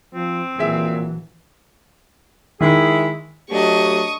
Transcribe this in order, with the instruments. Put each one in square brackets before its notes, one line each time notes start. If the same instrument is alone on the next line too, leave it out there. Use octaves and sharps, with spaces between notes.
[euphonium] F3 [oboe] C4
[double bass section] A#1 E3 F#3 [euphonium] A#2 [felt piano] G#4 E5
[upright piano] D#3 [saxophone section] G#3 E4 G#4
[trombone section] F#3 A3 G4 [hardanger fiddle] D4 D#5 [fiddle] C#6 D#6